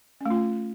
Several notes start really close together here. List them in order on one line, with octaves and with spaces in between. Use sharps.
C#4 A3 F4